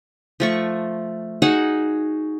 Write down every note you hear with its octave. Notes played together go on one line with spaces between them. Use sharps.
F3 A3 C#6
D#4 F#4 G#4 F#5